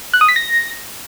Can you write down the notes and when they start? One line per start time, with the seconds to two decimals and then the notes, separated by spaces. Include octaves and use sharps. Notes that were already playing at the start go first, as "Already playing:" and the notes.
0.14 F#6
0.21 D#6
0.29 B6
0.36 A#6